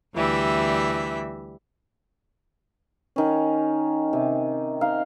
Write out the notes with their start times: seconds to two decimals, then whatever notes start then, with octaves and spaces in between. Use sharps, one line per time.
0.15 D2 E3 G3 E5
3.16 D#3 C#4
4.13 C3
4.81 D#4 F5